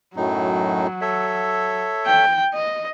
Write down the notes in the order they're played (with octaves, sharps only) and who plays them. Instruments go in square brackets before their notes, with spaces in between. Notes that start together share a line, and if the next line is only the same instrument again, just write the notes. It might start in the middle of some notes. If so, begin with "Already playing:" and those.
[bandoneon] F#2 A2 D#4 [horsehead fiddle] F#3
[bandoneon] A4 C#5 E5
[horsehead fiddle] G5
D#5